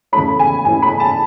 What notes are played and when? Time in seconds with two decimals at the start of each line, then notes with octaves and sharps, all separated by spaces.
0.12 E2 C#3 E3 A3 C#4 B5
0.39 G#5
0.65 E2 C#3 E3 A3 C#4 G#5
0.82 B5
1.00 A5